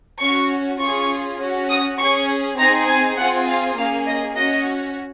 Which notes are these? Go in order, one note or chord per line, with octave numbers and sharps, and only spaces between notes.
C#4 F#4 C#6
C#4 F4 G#4 C#6
C#4 F#4
D#6
C#4 G#4 C#6
C4 D#4 G#4 A#5
G#5
C4 F4 G#4 F#5
F5
A#3 C#4 G#4 F5
D#5
C#4 F#4 D#5